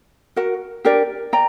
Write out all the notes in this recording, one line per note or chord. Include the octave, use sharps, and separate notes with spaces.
F#4 A#4 F#5
D4 G4 A#4 D5
D5 G5 A#5